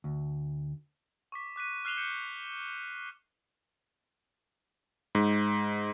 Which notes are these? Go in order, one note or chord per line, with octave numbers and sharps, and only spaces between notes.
D2
C#6 D6 B6
D6 F#6 B6 D#7
F6 F#6 C7 E7 F7 G7
G6 C#7 E7
G#2